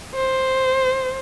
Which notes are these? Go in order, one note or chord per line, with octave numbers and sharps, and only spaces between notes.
C5